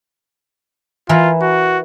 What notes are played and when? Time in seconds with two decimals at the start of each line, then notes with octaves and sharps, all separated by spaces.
1.09 E3 E4 F4 A#4
1.42 F#4